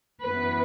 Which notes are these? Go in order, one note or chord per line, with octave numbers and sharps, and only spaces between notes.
F#2 E3 B3 B4